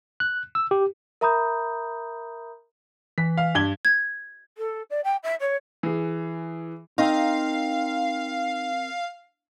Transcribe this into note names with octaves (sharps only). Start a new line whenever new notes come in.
F#6
E6
G4
A#4 E5 A#5 B5 D#6 G6
E3 B6
F5
G2 G#6 G7
G#6
A4
D5
G5
E5
C#5
E3 G#4
C4 D#4 A#4 F5 G5